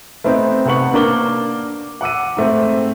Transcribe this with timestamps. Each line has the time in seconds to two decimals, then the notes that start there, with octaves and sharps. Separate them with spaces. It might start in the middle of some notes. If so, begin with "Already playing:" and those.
0.24 A3 B3 C4 D#4
0.65 C3 B3 F#5 C#6 F#7
0.93 A#3 D4 A#4 D6 G7
2.01 F#5 D6 E6 D#7
2.37 G#2 A3 C4